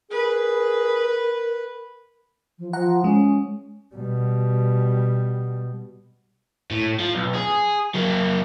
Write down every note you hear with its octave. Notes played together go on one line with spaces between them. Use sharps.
G#4 A#4 B4
F3
F3 F#5 A#5
G#3 C#4
B2 G3
A2
F3
B1
G#4
F#3 A#3